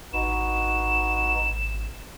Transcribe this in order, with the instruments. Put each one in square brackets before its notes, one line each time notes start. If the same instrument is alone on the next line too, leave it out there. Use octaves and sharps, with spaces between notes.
[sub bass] G#1 [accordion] D#4 F#4 B4 [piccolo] E7